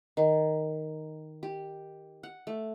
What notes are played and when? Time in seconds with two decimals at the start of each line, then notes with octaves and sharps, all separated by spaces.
0.17 D#3
1.43 G4
2.23 F#5
2.47 A3